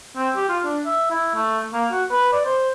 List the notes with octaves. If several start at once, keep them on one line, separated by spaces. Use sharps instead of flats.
C4
G4
F4
D4
E5
E4
A3
A#3
F#4
B4
D5
C5